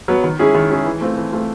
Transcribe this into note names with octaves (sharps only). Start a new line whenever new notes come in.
F#3 B3
D#3
G#3 C#4 E4 G#4
D#3
G#3 C#4 E4 G#4
E3
A3 C4 F4
E3
A3 C4 F4